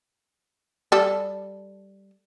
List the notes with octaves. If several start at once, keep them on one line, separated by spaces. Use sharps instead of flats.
G3 A4